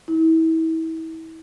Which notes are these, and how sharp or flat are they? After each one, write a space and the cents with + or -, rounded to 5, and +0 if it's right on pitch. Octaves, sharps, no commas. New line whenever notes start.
E4 -35